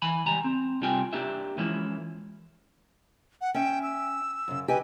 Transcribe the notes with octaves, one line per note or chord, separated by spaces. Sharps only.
E3 G#5 B5
C#2 G3 G#5 A#5
C4
C2 G3 C4 F4 G5 G#5
A#3 D4 G4 E5
E3 F3 G#3 A#3 C#4 E4
F#5
C#4 E5 G5
E6
F#2 C#3
G4 B4 D#5 G#5